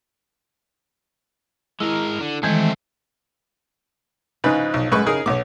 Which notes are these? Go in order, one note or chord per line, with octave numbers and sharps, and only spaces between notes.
G#3 E4 A#4
D3
D#3 E3 G#3 A3 C4
G#2 C#3 F3 D#4 B4
B1
F#2 G#3 A3 B4 C#6
C#3 D#4 G#4 A#4
B1 B3 C#5 D6